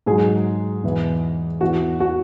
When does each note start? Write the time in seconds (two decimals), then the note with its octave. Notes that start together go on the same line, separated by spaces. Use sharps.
0.06 G#2 F#3 G#4
0.83 E2 E3
1.61 E2 E3 F#4
2.00 F#4